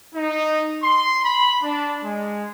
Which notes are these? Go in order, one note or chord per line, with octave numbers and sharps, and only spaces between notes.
D#4
C6
B5
D4
G#3